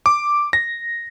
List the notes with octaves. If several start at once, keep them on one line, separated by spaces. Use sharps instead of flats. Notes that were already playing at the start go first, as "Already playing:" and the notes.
D6
A#6